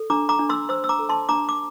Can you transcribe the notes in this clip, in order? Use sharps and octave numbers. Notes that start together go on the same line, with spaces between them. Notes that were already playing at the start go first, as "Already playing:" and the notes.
Already playing: A4
D4 A#5 D6
A#5 D6
D4
C6 E6
C5 C6 E6
E6
A#5 D6
A4
A5 C6
D4 A#5 D6
D6